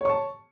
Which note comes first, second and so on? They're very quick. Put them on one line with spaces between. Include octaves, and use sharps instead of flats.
C#5 C#6 A5